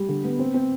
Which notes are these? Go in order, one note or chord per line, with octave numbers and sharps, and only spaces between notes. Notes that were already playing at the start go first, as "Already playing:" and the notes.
Already playing: G3
D3
B3
C4
C4